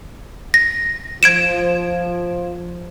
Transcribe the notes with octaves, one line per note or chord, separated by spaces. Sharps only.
A#6
F3 G#6 D7 E7